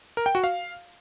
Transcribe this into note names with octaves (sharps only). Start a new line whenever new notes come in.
A#4
G5
F#4
F5